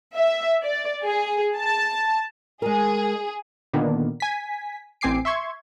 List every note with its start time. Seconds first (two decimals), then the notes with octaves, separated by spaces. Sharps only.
0.17 E5
0.63 D5
1.04 G#4
1.56 A5
2.62 G#3 G#4 A#4
3.73 A#2 D3 D#3 A#3 B3 D4
4.20 G#5 B6
5.01 A1 C4 G#5 D6 C7 D7
5.25 E5 C6 C#6 G#6